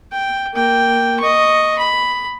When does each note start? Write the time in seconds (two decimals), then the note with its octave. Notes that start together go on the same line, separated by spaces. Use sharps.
0.12 G5
0.54 A#3 G5
1.20 D#5 C#6
1.78 B5